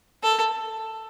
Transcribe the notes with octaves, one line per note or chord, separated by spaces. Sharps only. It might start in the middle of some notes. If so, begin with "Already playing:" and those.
A4